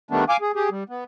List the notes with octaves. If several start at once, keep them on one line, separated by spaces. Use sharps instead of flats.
D#3 G3 A3 B3 D4
F5 G#5 D6
G#4
G4 G#4
G3
B3